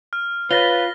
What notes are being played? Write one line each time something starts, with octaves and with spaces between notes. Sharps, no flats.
F6
F4 B4 C#5 F5 B5 A6 A#6 G7